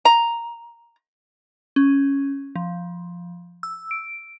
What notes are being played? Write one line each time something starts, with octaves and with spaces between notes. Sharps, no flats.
A#5
C#4
F3
E6
D7